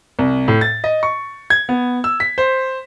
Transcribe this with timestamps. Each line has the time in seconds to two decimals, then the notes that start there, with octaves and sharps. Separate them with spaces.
0.19 C2
0.48 A2
0.61 A6
0.84 D#5
1.03 C#6
1.50 G#6
1.69 B3
2.04 E6
2.20 B6
2.38 C5